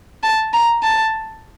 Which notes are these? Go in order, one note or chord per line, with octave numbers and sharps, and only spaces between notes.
A5
A#5
A5